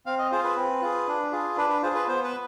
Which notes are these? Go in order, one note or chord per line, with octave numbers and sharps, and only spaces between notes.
C4 F5
D#5
F4 G#4 C5
B4
C4
F4 G#4
D4
F4 G#4
D4 B4
B4
F4 G#4 C5
B4
B3 C5
B4